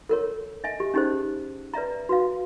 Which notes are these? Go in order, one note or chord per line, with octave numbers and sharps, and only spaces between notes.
A4 A#4 C#5
D#5 E5 G#5
G4
C#4 D#4 G4 G#4 C5
B4 D5 E5 A#5
F#4 B4 F5